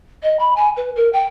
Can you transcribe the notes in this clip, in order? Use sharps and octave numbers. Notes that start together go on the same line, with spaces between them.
D#5
B5
G#5
B4
A#4
G5